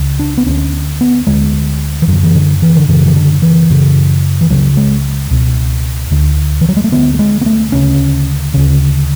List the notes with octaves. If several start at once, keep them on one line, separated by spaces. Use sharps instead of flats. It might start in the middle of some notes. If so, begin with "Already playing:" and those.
Already playing: C#2 C#3
D4
B3
D2 D3 C#4
B3
D2 D3 G#3
E3
F#2 D3 F#3
E3
D3
E3
D3
F#2 C#3 E3
E3
D3
E3
F#2 C#3
E3
C#2 C#3 F#3
G#3
C#2 B2
D2 D3
E3
F#3
G#3
A3
D2 D3 B3
A3
G#3
B3
A3
D2 C#3 C#4
D2 C#3 C#4